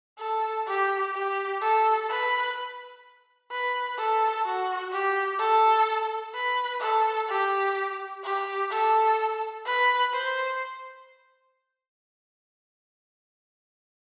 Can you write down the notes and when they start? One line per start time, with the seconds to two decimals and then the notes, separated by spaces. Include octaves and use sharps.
0.19 A4
0.66 G4
1.14 G4
1.61 A4
2.09 B4
3.51 B4
3.98 A4
4.45 F#4
4.92 G4
5.39 A4
6.34 B4
6.80 A4
7.28 G4
8.23 G4
8.71 A4
9.65 B4
10.12 C5